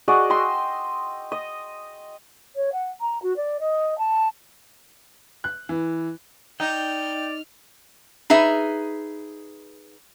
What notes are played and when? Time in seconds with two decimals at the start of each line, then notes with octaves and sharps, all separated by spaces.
0.08 F#4 G#4 D5 D#5
0.30 D#5 G5 C6 E6
1.32 D#5
2.55 C#5
2.72 F#5
3.01 A#5
3.22 F#4
3.36 D5
3.60 D#5
3.98 A5
5.44 F#6
5.69 E3
6.60 D#4 D5 G5 F6
8.30 D#4 G#4 B4 E5